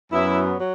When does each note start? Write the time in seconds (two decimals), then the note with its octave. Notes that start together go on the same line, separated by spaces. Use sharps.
0.12 F#2 F#3 B3 E4
0.59 F#3